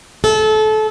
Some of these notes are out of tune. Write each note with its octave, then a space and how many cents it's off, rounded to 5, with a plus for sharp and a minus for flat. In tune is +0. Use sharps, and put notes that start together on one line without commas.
A4 -25